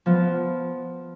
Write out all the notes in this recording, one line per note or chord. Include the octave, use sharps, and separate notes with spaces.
F3 B3